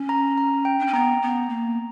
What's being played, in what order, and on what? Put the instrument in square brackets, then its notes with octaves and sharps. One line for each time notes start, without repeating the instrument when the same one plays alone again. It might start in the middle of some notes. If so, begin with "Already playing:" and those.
Already playing: [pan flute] C#4
[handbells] A#5
A#5
G5
[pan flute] D4
[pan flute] C#4 [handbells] G5
[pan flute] B3 [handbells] A#5
[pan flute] B3
A#3